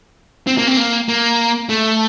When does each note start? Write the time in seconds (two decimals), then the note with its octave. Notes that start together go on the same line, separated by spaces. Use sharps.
0.47 C4
0.58 A#3
0.67 C4
0.77 A#3
1.09 A#3
1.69 A3